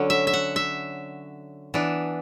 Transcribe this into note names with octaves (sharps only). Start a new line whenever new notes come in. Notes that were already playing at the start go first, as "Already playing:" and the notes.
Already playing: D3 F#3 C#4
E5
E5
F#5
E5
E3 B3 D4